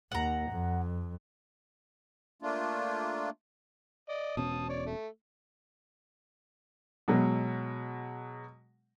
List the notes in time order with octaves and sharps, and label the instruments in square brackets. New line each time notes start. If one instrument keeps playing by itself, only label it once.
[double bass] D#2 [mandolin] F#5 A#5
[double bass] F2
[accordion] A3 A#3 D4 F4
[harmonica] D5 D#5
[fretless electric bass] E1 B2 C#4 [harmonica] A5 D#6
[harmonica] C#5 D5
A3
[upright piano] B2 F#3 G#3